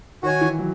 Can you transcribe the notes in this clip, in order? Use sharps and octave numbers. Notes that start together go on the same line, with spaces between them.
D#3 F#4 C#5 G#5
E3
F#3